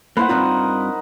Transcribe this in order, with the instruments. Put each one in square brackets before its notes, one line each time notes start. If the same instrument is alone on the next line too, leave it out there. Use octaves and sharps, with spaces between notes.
[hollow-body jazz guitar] A#3 E4 [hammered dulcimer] B4 C5 F#5
[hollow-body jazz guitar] G2 C4 F4 [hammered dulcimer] D#4 A#4 D#5